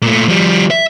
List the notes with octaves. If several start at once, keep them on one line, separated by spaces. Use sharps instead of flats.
A#2 A3
F3 G3
E5